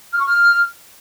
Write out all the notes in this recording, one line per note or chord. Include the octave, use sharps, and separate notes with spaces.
F6
C#6
F6